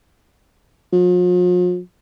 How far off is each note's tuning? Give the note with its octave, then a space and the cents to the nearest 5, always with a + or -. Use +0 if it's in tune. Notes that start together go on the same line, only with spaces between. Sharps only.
F3 +45